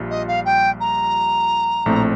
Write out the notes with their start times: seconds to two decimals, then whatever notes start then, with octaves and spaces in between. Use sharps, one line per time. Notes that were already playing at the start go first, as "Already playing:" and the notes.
Already playing: A#1 G3 F4
0.10 D#5
0.28 F5
0.45 G5
0.80 A#5
1.86 A#1 A2 A3 C4